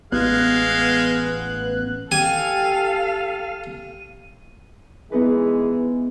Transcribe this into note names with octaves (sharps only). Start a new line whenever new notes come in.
A1 G#3 B3 F5 F#6
G4 A4 F5 G#5 D#7
E3 G#3 B3 D#4 G#4 B4